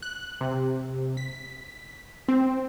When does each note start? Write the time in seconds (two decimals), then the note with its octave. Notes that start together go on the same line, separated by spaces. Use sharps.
0.02 F#6
0.41 C3
1.17 B6
2.28 C4